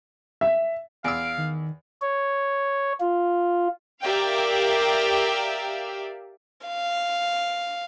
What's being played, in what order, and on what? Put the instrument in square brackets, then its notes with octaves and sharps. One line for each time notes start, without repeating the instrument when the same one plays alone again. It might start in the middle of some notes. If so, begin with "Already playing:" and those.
[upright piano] E5
[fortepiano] E2 E6 [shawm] F5 [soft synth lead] D7
[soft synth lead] D#3
[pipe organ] C#5
F4
[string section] G4 A#4 D5 E5 F5 G5
[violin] F5